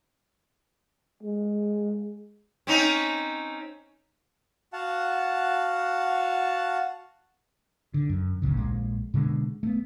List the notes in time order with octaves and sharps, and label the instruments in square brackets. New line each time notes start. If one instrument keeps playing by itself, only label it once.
[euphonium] G#3
[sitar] C4 C#4 D#4
[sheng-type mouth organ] F#4 F5 F#5 A5
[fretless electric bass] D3
F#2
G1 D2 A#2 C#3
A#1 A#2 G#3
B2 D3 F#3 G#3
A3 B3